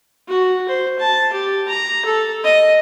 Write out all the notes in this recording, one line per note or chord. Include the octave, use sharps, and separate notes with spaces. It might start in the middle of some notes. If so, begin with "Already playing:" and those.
F#4
C5
A5
G4
A#5
A4
D#5